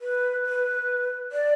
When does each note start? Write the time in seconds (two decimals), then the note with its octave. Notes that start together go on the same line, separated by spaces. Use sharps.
0.01 B4
0.45 B4
1.32 D5